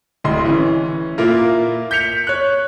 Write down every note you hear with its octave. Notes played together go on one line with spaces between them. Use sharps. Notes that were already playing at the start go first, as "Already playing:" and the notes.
D1 D2 D#5 C6
E3 C#4
A#2 A#3 E4 F4 A#4
G6 B6 C#7 F7
C#5 F#6